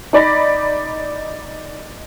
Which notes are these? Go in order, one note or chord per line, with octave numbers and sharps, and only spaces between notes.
D#4 D5 B5 A#6